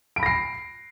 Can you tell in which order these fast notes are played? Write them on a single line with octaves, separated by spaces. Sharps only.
D7 B5 A#6 C7